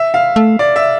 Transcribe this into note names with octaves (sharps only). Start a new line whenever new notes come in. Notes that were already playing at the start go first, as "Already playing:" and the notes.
Already playing: E5
F5
A3
D5
E5